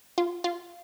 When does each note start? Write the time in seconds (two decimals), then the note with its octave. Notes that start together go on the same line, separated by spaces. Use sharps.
0.18 F4
0.44 F4